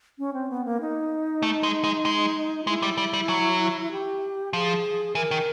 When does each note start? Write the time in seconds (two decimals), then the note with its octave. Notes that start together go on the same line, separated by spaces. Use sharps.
0.19 C#4
0.33 C4
0.50 B3
0.65 A#3
0.81 D#4
1.43 A3
1.63 G#3
1.84 G#3
2.05 G#3
2.63 F4
2.67 G#3 E4
2.83 G3
2.98 G3
3.13 G3
3.29 F#3
3.91 G4
4.53 F3 G#4
5.15 E3 A#4
5.31 D#3